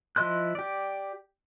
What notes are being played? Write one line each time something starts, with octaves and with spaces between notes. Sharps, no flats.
F3 E4 D#5 C6 F#6
G4 D5